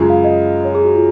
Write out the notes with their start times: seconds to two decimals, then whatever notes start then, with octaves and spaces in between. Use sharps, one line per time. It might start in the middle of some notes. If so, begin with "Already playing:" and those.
Already playing: F#2 C#3 G#3 F4
0.10 F5
0.24 D#5
0.64 C#5
0.75 G#4
0.84 F#4
0.95 F4